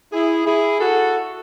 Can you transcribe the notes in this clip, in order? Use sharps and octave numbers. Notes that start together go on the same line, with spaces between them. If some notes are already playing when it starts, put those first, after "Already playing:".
E4 G#4
E4 G#4
F#4 A4